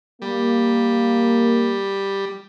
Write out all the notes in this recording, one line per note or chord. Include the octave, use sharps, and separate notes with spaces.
G3 A#3